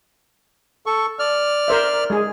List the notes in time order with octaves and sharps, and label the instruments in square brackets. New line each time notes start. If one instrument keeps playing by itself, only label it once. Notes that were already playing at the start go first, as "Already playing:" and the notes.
[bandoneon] A4 C#6
D5 F6
[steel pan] A#4 C5 E5
G#3 G#4